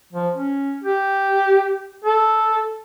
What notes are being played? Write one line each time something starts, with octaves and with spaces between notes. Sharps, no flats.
F3
C#4
G4
A4